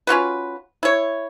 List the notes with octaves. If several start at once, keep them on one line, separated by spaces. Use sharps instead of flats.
C#4 F4 F#4 B4
E4 C#5